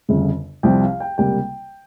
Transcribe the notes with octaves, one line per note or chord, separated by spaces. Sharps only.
G1 F2 C#3
C2 C3 F3 C4 G5
F5
G5
C#2 C3 G3 A#3 G5